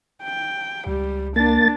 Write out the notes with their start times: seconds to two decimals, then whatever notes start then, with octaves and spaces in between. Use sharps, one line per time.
0.23 G5
0.87 C#2 G3
1.36 A#3 D4 A6